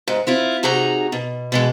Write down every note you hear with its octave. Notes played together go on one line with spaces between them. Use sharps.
G#2
C4 E4 F4
C3 D#4 F#4 G#4 A#5
B2
B2 E3 G#3